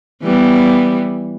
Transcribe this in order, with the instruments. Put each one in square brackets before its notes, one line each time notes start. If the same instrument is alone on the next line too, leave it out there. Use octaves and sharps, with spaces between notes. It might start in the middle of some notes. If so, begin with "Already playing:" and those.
[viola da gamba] E3 G3 B3